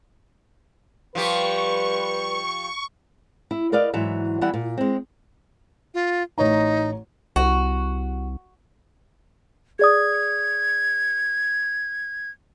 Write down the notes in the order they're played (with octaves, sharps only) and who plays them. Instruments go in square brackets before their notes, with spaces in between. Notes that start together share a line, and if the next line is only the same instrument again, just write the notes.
[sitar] F3 G4 [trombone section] G3 B4 [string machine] C#6
[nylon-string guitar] E4
A#4 B4 D5 D#5 F5
G#2 E3 F#3 E5
E3 G3 B3 E4 F#5
A#2
G#3 C4
[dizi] F4
[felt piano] A1 C#5 A#5 [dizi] D#4
[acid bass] C2 [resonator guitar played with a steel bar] F#4
[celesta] G#4 D5 D#6 [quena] G#6